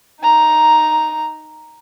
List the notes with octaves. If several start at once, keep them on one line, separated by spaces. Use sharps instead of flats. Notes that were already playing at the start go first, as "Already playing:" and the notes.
D#4 A#5